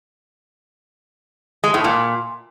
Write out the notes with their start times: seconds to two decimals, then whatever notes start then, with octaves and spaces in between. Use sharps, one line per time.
1.64 G#3
1.74 A2
1.84 A#2